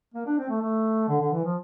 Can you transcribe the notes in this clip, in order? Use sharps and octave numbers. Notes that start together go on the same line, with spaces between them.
A#3
D4
C4
A3
A3
D3
D3
E3
F3